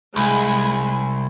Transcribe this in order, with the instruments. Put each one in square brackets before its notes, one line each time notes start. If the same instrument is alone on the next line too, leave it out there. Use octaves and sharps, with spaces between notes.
[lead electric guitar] C2 [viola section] G#3 G#5 B5